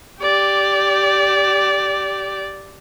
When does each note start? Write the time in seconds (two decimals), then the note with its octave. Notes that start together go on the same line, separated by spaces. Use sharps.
0.21 G4 D5